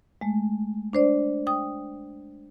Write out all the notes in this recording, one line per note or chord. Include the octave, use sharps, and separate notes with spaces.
G#3 A3
D4 C5 D5
G5 D#6